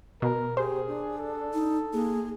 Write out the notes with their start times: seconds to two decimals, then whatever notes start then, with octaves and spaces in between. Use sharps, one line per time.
0.22 B2 A#4
0.57 G4 G#4 C5
0.87 D4
1.18 A4
1.53 D#4
1.93 A#3 G#4